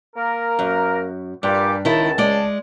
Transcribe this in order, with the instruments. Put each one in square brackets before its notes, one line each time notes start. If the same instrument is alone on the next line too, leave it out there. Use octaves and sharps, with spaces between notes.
[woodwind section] A#3 A#4
[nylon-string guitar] F#2
[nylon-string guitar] G2 [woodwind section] A#2 G3 D6
[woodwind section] C#2 A5 [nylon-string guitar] D#3 E4
[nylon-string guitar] G#3 D5